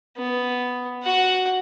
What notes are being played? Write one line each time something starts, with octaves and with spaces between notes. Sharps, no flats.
B3
F#4 F#5